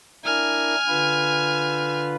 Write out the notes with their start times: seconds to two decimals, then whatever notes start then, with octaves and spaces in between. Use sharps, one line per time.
0.25 D4 E4 A#4 G#5 F6
0.87 D3 F4 B4